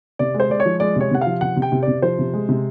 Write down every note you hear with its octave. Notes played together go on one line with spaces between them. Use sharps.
C3 D5
G#3
C5
G#3 D5
C#5
F3
G#3 D5
C3 C#5
C3 F#5
F5
F3
C3 F#5
C3
G5
C3
D5
C3
F3 C5
C3
G#3
C3